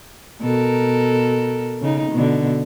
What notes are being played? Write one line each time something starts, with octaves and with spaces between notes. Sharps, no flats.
B2 A4 A#4
C#3 D#4
B2 D3